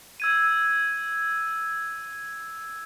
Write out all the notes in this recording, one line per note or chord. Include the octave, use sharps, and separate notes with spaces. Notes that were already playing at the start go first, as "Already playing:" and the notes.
E6 G#6 D#7